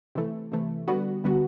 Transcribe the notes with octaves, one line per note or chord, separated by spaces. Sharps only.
C3 E3 A3
C3 E3 A3
D3 G3 B3 F#4
D3 G3 B3 F#4